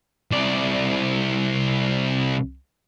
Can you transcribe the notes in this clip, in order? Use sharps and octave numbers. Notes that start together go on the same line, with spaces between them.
C2 D5